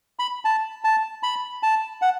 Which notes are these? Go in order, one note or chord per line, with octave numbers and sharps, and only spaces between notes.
B5
A5
A5
B5
A5
F#5